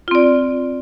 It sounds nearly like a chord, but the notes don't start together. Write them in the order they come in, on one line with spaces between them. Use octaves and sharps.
F4 C4 D5